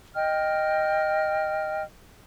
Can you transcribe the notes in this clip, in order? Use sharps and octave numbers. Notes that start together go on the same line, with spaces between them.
D#5 G5 F6